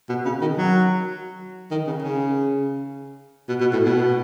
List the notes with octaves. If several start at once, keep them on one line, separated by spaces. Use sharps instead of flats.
B2
C#3
D#3
F#3
D#3
C#3
C#3
B2
B2
A2
B2